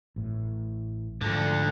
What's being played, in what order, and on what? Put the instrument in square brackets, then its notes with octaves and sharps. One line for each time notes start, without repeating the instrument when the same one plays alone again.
[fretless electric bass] A1 A2
[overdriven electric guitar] D2 D3 [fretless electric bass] G#2 F3